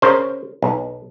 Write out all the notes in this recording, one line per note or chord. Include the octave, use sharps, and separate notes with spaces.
C#3 A#4 C5
B1